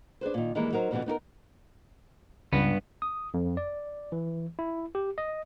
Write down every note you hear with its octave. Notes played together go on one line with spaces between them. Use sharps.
D4 G#4 B4 C5
A#2 D#3
D#3 E3 G3 G#3 A#3 E4
F#3 D#4 A#4 C5
F2 B2 D3 E3 G3 B3
B3 D#4 F#4 A#4
C#2 G2 B3
D#6
F2
D5
E3
E4
G4
D#5